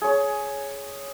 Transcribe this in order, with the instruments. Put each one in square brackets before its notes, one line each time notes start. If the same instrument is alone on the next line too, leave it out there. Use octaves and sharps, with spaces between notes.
[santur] G#4 C#5